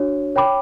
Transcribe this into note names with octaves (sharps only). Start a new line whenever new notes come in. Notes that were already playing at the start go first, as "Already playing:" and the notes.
Already playing: D4 F#4 C#5
C#5 G5 B5 D6